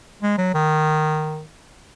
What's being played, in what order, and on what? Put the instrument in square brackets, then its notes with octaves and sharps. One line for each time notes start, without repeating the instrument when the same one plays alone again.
[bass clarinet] G#3
F#3
D#3